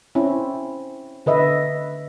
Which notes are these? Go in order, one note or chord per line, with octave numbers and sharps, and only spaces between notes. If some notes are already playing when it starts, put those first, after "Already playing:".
C4 C#4 E4
D3 B4 D#5 E5